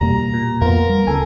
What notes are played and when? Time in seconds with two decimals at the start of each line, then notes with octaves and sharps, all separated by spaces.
0.01 E2 B2 G3 A#3 A#5
0.34 A#2
0.61 F2 A#3 B3 F4 A#4
0.89 G3
1.07 D2 C#3 A4 G#5